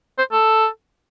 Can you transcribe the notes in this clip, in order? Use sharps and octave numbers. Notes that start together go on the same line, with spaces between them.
C5
A4